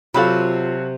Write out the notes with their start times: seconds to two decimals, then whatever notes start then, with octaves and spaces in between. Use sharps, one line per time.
0.14 C3 F#3 F4 F#4 A4 F5 A5 B5